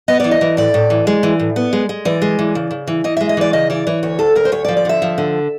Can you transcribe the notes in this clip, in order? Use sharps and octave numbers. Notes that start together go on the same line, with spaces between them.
B3 D#5
E3 D5
D#5
E3
A2 D5
A2
E3
G#3
E3
A2
B3
G#3
G#3
E3 D5
G#3
E3
C#3
C#3
E3
E3 D#5
G#3 E5
D#5
E3 D5
C#3 D#5
E3 D5
E3 C#5
D2 C#5
D2 A4
D2 A#4
C5
D2 C#5
D5
F3
D5
D3 E5
F3
D3